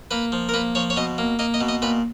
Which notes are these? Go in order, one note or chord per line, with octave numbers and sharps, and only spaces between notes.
A#3 B4
F3
A#4
A#3 B4
F3 C#5
C#5
B2 D#5
A#3
A#3 D#5
D#5
B2
D#5
A#2 B4